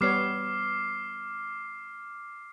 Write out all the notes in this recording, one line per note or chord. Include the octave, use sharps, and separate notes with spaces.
G3 B3 C#5 D6 F6 C7